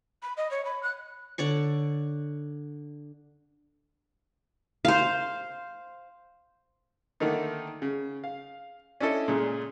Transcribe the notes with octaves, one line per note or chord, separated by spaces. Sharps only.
B5
D#5
C#5
B5
F#6
D3 C#5 D5 C#6
C5 F5
D3 D#3 A3 A#3 D#4
C#3
F5
C#4 D4 E4 A4 D#5
A#2 C#3 G#3 G#4